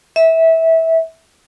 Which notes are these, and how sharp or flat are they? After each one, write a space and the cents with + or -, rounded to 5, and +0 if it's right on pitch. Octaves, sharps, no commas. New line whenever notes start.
E5 -20